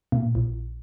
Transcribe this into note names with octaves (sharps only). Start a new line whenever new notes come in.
A#2
A#1